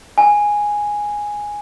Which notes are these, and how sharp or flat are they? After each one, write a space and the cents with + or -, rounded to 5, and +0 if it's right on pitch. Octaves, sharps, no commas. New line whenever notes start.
G#5 -5